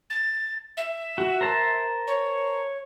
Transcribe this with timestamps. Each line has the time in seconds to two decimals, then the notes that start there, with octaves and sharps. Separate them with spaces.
0.10 A6
0.77 E5
1.18 F#4
1.41 A#4 C5 A5
2.07 C#5